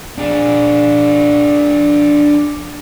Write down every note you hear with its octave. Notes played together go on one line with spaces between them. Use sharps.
D4 G#4